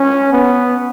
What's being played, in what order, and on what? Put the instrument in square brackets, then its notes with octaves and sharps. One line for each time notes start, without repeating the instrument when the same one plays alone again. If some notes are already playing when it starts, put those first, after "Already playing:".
Already playing: [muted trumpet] C#4
B3